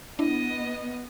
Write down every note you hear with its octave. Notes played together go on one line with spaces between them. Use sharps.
B3 D4 E4 D#5